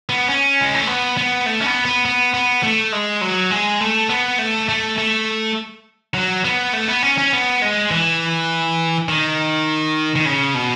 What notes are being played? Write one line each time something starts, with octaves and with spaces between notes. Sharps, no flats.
B3
C#4
G#3
A3
B3
B3
A3
C#4
B3
B3
B3
B3
A3
G#3
F#3
G#3
A3
B3
A3
A3
A3
F#3
B3
A3
B3
C#4
C#4
B3
G#3
E3
D#3
D#3
C#3
B2